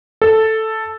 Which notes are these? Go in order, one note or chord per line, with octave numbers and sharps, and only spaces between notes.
A4